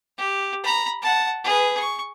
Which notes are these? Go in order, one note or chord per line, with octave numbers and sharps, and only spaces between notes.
G4
A#5 B5
F#5 A5
G#4 B4
C#6